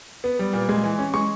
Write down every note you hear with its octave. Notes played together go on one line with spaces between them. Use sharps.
B3
G3
A#2
G#3
E3
C#4
G#3 C#6